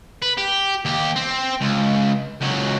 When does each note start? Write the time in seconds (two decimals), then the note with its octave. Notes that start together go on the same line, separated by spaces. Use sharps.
0.22 B4
0.38 G4
0.85 D#2 G4
1.16 C4
1.61 C#2
2.41 C#2 F#3